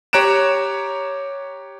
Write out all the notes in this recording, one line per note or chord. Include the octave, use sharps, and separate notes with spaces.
G4 C#5 A#5 F#6 D7 E7